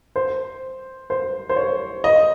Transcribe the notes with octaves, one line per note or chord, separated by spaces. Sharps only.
C5
C5
C5
C#5
D#5